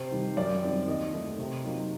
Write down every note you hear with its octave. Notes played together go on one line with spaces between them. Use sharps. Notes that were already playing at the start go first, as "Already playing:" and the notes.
Already playing: C3 C5
D#3 G3
F#2 D5
D#3 G3 C4
D#2 D#5
D#3 A3 D#4
C3
F#3 A#3 D#4